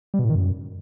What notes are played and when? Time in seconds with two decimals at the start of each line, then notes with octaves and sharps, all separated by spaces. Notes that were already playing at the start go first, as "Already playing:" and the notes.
0.14 G3
0.19 B2
0.25 A2
0.30 D#3
0.35 F#2